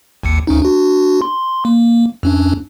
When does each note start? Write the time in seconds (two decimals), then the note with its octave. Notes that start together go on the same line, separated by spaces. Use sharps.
0.23 G#1 D#2 C#7
0.47 D2 C#4 D#4
0.62 D4 F#4
1.22 C6
1.65 A#3
2.23 F2 C#4 D4